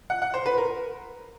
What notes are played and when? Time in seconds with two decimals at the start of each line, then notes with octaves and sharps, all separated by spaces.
0.10 F#5
0.22 F#5
0.34 C5
0.46 B4
0.58 A#4